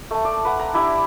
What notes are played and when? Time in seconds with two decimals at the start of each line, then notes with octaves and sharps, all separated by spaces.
0.11 A3 A5
0.25 D5
0.45 B4 F#5
0.60 A#5
0.73 D4 E4 G4 E5